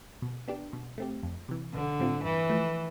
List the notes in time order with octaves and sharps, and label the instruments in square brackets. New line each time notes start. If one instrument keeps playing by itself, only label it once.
[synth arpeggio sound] B2
B3 D4 G4
B2
A3 C4 G4
F2
C3 E3
[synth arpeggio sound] B1 [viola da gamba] D3
[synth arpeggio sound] A2 G3 C4 F4
[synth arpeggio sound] G2 [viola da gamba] E3
[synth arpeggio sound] F3 A3